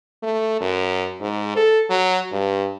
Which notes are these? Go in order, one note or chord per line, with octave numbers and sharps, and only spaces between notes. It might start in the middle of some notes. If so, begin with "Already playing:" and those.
A3
F#2
G#2
A4
F#3
G2